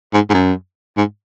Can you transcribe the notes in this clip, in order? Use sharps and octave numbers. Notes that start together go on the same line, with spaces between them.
G#2
G#2
F#2
G#2